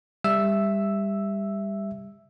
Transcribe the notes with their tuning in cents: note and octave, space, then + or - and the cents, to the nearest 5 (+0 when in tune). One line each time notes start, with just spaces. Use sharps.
G3 +25 E5 +5 E6 +0